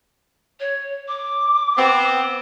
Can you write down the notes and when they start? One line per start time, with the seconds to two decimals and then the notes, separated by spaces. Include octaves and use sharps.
0.60 C#5
1.08 D6
1.78 B3 C4